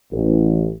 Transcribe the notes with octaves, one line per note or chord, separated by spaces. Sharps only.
A1